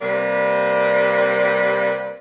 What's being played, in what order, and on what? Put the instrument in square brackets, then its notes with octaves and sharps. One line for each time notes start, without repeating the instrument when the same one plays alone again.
[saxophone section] C3 G3 A#3 B4 C5 D5